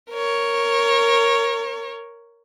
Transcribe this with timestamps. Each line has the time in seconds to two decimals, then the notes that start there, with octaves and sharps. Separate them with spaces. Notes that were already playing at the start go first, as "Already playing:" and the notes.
0.11 A#4 C#5